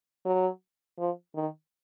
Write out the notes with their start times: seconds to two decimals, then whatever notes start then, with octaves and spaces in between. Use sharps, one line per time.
0.25 F#3
0.98 F3
1.35 D#3